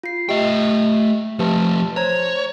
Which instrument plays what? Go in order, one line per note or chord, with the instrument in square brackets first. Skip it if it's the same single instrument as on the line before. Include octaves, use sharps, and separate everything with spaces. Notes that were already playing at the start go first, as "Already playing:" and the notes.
[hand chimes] F4 C7
[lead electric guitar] A3 G5 [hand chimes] G4 D#5 E5
[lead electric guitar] F3 A3 [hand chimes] G4 B4 A5
[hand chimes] C5 A#5 G#6 [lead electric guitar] C#5